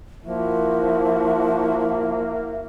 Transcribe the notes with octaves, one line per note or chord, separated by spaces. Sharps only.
F3 A#3 E4 F#4 E5